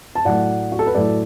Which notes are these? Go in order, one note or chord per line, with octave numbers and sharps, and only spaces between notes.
A5
A2 F#3 A3 D5 F#5
F#4
A4
B4
A2 F#3 A3 A4 D5